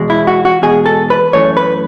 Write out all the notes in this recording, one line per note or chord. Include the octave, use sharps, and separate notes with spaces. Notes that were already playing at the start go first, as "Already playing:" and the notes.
Already playing: E2 B2 G#3
E4
F#4
F#4
E2 B2 G#3 G#4
A4
B4
F#2 E3 A3 C#5
B4